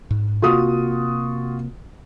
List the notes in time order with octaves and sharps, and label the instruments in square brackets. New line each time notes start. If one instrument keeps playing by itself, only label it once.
[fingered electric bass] G#2
[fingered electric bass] C3 A#3 [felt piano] F4 F#4 D#6